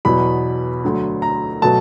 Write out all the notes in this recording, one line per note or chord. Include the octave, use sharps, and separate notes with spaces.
E2 B2 F#3 B5
D2 D3 F#3
A#5
B2 F#3 A3 A5